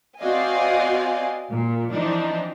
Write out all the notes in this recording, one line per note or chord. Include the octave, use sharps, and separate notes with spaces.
C4 F#4 D5 D#5 F5 G#5
A#2
E3 F3 C4 D4 D#4